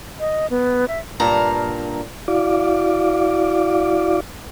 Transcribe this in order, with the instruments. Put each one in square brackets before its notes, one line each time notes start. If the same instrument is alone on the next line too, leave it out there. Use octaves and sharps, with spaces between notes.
[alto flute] D#5
B3
E5
[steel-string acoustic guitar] G2 A#2 F5 A5 A#5
[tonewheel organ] E4 F#4 D5 F5 D6